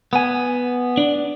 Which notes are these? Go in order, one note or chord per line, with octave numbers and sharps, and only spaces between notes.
B3 G#5
D4